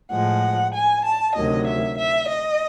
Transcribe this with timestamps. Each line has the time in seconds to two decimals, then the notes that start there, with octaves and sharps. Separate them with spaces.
0.11 A2 F3 G#3 F#5
0.73 G#5
1.05 A5
1.35 D2 C3 D#3 F#3 D#5
1.67 E5
1.97 E5
2.28 D#5